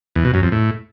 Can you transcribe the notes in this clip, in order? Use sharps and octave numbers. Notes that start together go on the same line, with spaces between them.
E2
B2
F#2
F2
A2